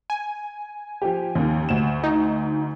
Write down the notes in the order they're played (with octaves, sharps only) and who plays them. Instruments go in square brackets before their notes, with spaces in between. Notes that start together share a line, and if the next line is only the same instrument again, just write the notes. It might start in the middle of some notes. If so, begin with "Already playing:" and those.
[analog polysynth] G#5
[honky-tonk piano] F3 G4
D#2 D#3
D2 E7
[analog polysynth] D#4